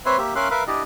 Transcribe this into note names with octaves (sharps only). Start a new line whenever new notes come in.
C4 B4 C#5 E5 C6
A#3 G4 E5
C#4 A#4 E5 F5 C6 F#6
A#4 B4 E5 F5
D4 E4 G4 D5 D#5